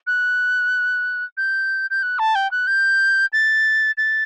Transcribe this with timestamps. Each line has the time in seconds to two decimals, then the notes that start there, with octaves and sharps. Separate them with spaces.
0.07 F#6
1.37 G6
1.90 G6
2.03 F#6
2.19 A5
2.35 G5
2.51 F#6
2.67 G6
3.33 A6
3.97 A6